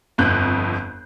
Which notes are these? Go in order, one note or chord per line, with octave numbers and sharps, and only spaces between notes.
G1 F2 F#6 G6